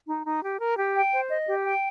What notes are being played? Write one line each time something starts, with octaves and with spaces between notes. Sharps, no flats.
D#4
D#4
G4
A#4
G4
G5
C5
D#5
G4
G5